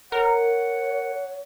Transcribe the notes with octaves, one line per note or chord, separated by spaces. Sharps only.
A#4 C#5 F#5